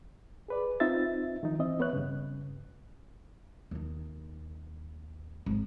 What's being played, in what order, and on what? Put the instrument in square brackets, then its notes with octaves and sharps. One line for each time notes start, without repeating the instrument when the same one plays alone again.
[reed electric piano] G#4 B4 D5
C4 D#4 F4 E5 A6
D#3 F3 D#4
E3 C4 D#5 E5
B3 B4 C#5 F#6
G2 C#3
[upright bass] D#2 D#4
G#1